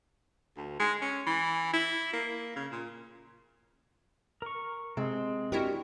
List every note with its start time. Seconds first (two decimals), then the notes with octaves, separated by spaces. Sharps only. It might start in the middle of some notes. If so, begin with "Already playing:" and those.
0.57 D2
0.80 G#3
1.02 C#4
1.26 E3
1.73 E4
2.13 A#3
2.56 C#3
2.72 A#2
4.42 A#4 C#6
4.97 C3 G#3 C4
5.52 D4 E4 F#4 G4 A#4